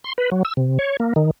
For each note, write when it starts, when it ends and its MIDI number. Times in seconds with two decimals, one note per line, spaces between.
0.04 0.13 84
0.18 0.30 71
0.32 0.43 54
0.45 0.53 88
0.57 0.78 48
0.79 0.97 73
1.00 1.13 58
1.16 1.31 51